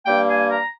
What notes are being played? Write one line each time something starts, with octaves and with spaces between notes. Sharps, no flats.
G2 G3 A#3 G5
G#5
A#5